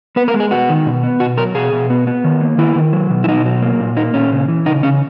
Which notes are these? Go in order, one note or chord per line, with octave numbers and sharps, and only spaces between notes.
B3 B4
A#4
G#3
G#4
B3 F#4
D#3
B2
B3
B2 F#4
F#3 A#4
B2 G#4
B2
B3
B3
D#3
A#3
D#3 E4
D#3
F#3
B2
E4
B2 D#4
F#3
A#3
A#2
A#3 D#4
A#2 C#4
C#3
E3
C#3 D#4
C#3 C#4